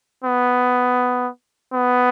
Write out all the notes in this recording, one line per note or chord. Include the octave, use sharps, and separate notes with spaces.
B3
B3